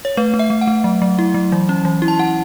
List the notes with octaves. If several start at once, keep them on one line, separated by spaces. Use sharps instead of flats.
C#5
A3 B4
A3
E5
A3
F#5
A3
F#3
F#3
E4
F#3
E3
C#4
E3
E4
A5
E4 F#5